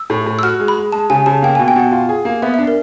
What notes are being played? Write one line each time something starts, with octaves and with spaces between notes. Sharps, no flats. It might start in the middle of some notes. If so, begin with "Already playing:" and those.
Already playing: E6
A2
A2
E6
F#4 F6
G#3
B5
G#3
G#3 A5
C#3 G#5
C#3 A5
A#3 G5
B2 G#5
G5
B2 F#5
F4
G#4
A#3
B3 E5
D4 E5
A#4